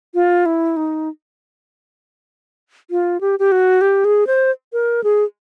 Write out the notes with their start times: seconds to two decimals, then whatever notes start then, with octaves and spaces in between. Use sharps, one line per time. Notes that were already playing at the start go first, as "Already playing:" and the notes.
0.14 F4
0.46 E4
0.77 D#4
2.91 F4
3.21 G4
3.39 G4
3.52 F#4
3.81 G4
4.05 G#4
4.27 C5
4.73 A#4
5.04 G#4